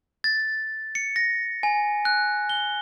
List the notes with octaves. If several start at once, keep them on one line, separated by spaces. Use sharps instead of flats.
A6
C#7
A#6
G#5
F#6
G7